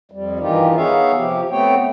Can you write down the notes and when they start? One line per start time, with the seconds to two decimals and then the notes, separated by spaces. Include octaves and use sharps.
0.12 F2 G3
0.39 G2 D#3 E3 D#4 F4 G4
0.76 B3 D#4 G#4 C#5 E5 F5
1.15 C3 F3 G4
1.50 A3 B3 C4 C#5 G5